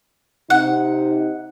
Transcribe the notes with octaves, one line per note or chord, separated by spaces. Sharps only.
C3 D#4 F#5